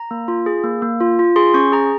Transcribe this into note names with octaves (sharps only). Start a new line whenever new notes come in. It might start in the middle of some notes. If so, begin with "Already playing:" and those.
Already playing: A#5
A#3
F4
G#4
A#3
A#3
F4
F4
G#4 C6
C#4 C#6
G#4 A#5